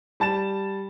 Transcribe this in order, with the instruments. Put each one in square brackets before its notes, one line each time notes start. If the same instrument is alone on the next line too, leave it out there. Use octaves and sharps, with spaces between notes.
[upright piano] G3 A5 A6 E7